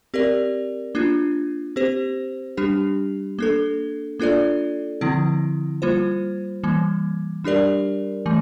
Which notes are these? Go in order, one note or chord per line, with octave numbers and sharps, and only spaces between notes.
C4 G4 A#4 D5
A#3 D4 F4
C4 G4 C5
G3 D4 G4
A#3 D4 A4
A#3 D4 F4 A4 D5
D3 F3 C4 E4
G3 A#3 F4 C5
E3 G3 A#3
G3 D4 G4 A#4 D5
E3 A3